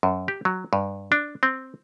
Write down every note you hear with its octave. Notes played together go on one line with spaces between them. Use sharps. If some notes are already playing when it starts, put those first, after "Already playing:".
F#2
G4
F#3
G2
D4
C4